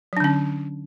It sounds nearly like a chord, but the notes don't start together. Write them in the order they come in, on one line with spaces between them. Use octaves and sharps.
F#3 D4 D3 C#4